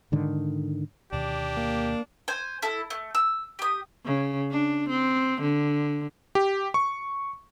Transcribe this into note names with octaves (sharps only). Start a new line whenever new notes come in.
G#2 D3 D#3
D2 B2 D#3 D4 G4
A#3
C5 G#5
E4 A4
A3
E6
G4 D#6
C#3
D4
C4
D3
G4
C#6